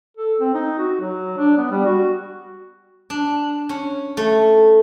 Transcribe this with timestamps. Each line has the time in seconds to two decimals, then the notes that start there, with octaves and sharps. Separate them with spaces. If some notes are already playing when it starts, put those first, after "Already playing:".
0.17 A4
0.40 C4
0.54 D#4
0.78 F#4
1.01 F#3
1.38 D4
1.58 B3
1.71 G3
1.86 F#4
3.10 D4
3.69 C#4
4.17 A3